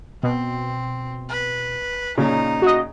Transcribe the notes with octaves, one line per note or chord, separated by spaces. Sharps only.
B2 C4
B4
A#2 C#3 D#4
F#4 D#5